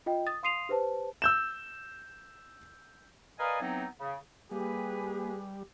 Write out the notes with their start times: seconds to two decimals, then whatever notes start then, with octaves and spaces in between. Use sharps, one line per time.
0.06 F4 D#5 G5
0.26 D#6 A6
0.43 F5 C6 D#6 C7 D#7 F7
0.69 G4 B4 C5 A5
1.22 E6 G6 E7
3.39 A#4 B4 D5 D#5 F5 G#5
3.61 E3 F#3 B3 C4 D#4
4.00 C#3
4.51 G3 A#3 G4 G#4 B4